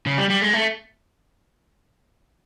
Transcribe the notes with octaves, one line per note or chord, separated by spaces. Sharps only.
C#3
G3
G3
G#3
A3